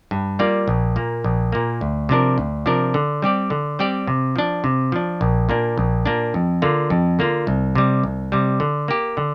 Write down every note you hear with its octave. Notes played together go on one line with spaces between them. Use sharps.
G2
G3 A#3 F4 D5
A#1
A#2 A#3
A#1
A#2 A#3
D2
C3 F3 D4 A#4
D2
C3 F3 D4 A#4
D3
G3 C4 G4 D5
D3
G3 C4 G4 D5
C3
F3 D4
C3
F3 D4
A#1
A#2 A#3 D4
A#1
A#2 A#3 D4
F2
D3 A#3 F4
F2
D3 A#3 F4
C2
C3 G3
C2
C3 G3
D3
A#3 G4
D3